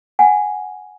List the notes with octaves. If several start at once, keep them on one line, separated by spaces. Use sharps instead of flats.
F#5 G#5